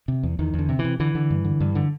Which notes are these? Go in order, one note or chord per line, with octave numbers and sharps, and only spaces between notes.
C3
E2
E2 D#3
E2
D3
C3
E3
C3
D3 E3
D3
G2
D3
G2
D3